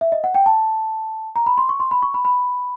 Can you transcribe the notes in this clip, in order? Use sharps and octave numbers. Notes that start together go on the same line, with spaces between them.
E5
D#5
F#5
G5
A5
A#5
B5
C6
C#6
C6
B5
C#6
B5
B5